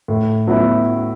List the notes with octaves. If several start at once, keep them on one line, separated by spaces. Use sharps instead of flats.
A2
F#3 B3 E4